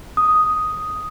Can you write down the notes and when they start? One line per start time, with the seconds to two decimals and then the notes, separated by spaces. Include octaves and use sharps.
0.17 D#6